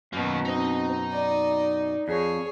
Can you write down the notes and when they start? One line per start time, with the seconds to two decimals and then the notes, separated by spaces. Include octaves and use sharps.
0.13 F#2 B2 D#3 A#3
0.45 C4 D#4 D#5
1.12 D5
2.08 F2 G#4 C#5